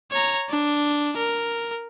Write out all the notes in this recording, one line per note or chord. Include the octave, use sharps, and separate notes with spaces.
C#5 A#5
D4
A#4